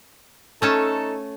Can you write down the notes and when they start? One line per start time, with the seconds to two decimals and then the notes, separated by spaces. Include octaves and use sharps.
0.62 A3 C#4 D#4 A4 A5